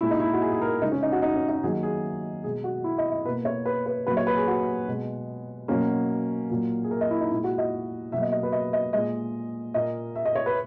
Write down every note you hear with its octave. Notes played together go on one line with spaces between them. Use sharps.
A#2 G#3 E4
D#4
E4
F#4
G#4
G#4
A#4
C#3 G#3 D#4
C#4
D#4
F#4
D#4
C#4
D#4
D#3 F#3 A#3 G#4
G#4
B2 G#3 G#4
F#4
E4
D#5
D#5
B2 A#3 B4
C#5
B4
B4
A#2 F#3 A#3 B4
C#5
B4
G#4
F#4
B2 G#3
B2 F#3 A#3 C#4
A#2 F#3 A#3
G#4
A#4
D#5
E4
D#4
A#2 G#3 E4
F#4
D#5
B2 F#3 A#3 E5
D#5
D#5
B4
D#5
D#5
A#2 G#3 D#5
A#2 A#3 D#5
E5
D#5
C#5
B4